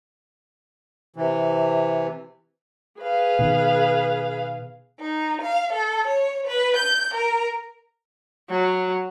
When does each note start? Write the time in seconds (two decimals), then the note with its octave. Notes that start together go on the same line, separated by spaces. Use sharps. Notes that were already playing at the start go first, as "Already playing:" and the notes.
1.16 C3 E3
3.01 G#4 B4 F5
3.39 B2 D#3
4.99 D#4
5.40 F5
5.72 A4
6.07 C#5
6.46 B4
6.76 G6
7.14 A#4
8.50 F#3